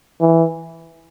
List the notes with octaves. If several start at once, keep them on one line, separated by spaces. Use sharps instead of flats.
E3